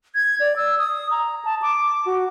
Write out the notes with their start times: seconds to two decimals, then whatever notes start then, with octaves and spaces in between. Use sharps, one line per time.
0.15 G#6
0.40 D5
0.56 E6
0.78 D#6
1.11 A#5
1.45 A5
1.62 D6
2.06 F#4